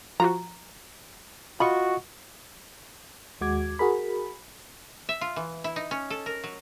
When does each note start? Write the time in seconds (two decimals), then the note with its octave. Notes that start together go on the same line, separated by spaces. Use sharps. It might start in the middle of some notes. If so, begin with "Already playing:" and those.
0.20 F3 F4 F#4 A#5
1.60 F4 F#4 D#5 B5 C#6
3.41 D#2 G#3 F#4 D6 G#6
3.79 F#4 G#4 A#4 B5
5.09 E5
5.21 F4
5.36 E3
5.64 E4
5.76 D#4
5.91 C#4
6.10 A4
6.26 A#4
6.44 F#3